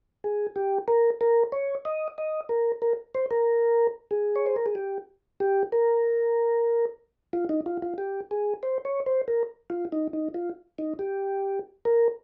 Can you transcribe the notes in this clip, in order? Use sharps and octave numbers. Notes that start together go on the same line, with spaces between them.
G#4
G4
A#4
A#4
C#5
D#5
D#5
A#4
A#4
C5
A#4
G#4
C#5
C5
A#4
G#4
G4
G4
A#4
F4
D#4
F4
F4
G4
G#4
C5
C#5
C5
A#4
F4
D#4
D#4
F4
D#4
G4
A#4